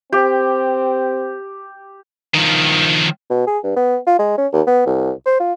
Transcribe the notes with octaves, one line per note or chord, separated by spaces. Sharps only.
C4 G4
D#3 F3
B2
G#4
G2
B3
F4
G#3
C#4
D#2
B3
C2
C5
F4